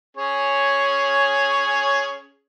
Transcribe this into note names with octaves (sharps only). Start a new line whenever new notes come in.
C#4 G#4 C#5